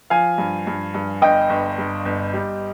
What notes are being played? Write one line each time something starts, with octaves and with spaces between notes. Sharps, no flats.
F3 F5 G#5
G2
G2
G2
G1 D#5 G5
G1
G2
G1
G3